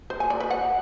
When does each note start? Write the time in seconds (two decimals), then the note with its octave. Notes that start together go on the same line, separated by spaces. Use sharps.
0.10 C5
0.20 G#5
0.30 D5
0.40 B4
0.50 F#5